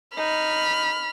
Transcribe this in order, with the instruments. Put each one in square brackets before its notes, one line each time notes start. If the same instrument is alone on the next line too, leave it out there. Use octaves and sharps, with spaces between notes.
[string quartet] D#4 [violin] B5 F6